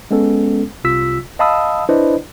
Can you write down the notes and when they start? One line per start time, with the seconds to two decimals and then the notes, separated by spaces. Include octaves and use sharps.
0.11 G#3 B3 C#4 A4
0.84 C2 C3 F4 E6 B6
1.39 D#5 F5 A5 B5 D#6 E6
1.89 D4 E4 B4 C5 D5 D#5